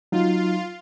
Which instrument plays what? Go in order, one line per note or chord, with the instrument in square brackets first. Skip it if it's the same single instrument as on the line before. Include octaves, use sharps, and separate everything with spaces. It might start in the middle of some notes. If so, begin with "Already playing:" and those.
[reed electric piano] F#3 D#4 [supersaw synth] F4